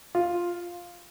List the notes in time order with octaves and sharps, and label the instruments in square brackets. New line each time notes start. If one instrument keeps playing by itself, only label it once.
[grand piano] F4